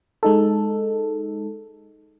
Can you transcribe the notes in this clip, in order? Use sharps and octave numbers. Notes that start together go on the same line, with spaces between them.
G#3 D#4 A4